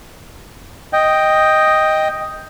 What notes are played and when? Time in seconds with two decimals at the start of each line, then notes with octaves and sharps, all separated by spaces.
0.93 D#5 G5